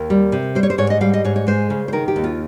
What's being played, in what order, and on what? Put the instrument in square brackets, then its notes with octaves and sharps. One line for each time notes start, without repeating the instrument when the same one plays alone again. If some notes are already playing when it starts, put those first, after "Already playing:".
Already playing: [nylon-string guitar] D#2 A#4
G3
C3
G3 C5
C#5
C5
G#2 C#5
D#5
G3 F5
D#5
G#2 C#5
C#5
G#3 C5
C#3
C5
D#3 A#4
G4
D#2
F4